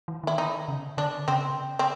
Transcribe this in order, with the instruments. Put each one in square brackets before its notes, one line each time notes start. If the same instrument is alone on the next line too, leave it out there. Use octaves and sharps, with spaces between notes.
[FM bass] E3
[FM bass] D#3 [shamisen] E4
[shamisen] D#4
[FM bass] C#3
[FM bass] D3 [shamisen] D4
[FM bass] C#3 [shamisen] C4
[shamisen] C4